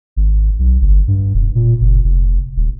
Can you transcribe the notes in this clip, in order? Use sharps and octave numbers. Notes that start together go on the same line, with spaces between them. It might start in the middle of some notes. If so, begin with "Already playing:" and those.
G#1
B1
G1
G2
E1
A#2
F#1
F1
D#1